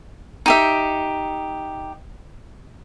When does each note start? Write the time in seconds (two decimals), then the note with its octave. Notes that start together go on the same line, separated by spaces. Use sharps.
0.46 D#4 G4 E5